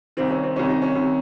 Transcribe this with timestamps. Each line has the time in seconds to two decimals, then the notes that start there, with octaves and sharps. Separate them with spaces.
0.17 C2 C3 D#3 C4
0.30 C#4
0.43 C4
0.56 C2 C3 D#3 C#4
0.69 D#4
0.82 C#4
0.95 C2 C3 D#3